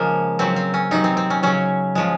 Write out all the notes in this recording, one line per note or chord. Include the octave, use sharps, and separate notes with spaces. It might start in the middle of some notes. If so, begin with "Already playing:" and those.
Already playing: C#3 F3 G#3 A#3
C#3 F#3 C4
C4
C#4
C3 F#3 D#4
C4
C4
C#4
C#3 F#3 C#4
C#3 F3 G#3